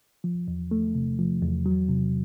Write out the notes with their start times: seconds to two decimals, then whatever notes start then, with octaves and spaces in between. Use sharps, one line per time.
0.24 F3
0.48 E2
0.71 A3
0.95 C3
1.19 F3
1.42 E2
1.66 F#3
1.89 C3